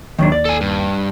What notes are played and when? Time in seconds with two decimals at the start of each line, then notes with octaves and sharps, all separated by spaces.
0.18 D#2 D#3 F#3 D4
0.32 D5
0.45 A4 G#5
0.61 G2